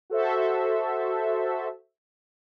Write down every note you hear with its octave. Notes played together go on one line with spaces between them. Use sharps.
F#4 A4 C5 E5